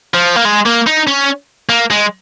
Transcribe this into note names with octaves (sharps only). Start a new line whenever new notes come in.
F3
A#3
G#3
A#3
D#4
C#4
A#3
G#3